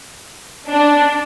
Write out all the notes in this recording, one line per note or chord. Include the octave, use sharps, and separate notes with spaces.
D4